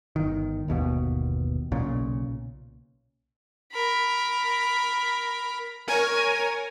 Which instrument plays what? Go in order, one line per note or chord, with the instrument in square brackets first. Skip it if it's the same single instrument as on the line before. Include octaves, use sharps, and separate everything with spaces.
[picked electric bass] G1 D#3
G1 D#2 B2
B1 A#2 C#3
[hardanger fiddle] A#4 B5
[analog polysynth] A#4 C#5 [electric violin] G#5